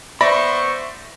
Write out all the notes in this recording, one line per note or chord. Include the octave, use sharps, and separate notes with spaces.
B3 C5 D5 E5 B5 C#6 A#6